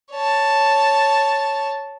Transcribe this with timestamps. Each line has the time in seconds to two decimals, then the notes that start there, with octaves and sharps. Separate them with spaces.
0.12 C#5 A5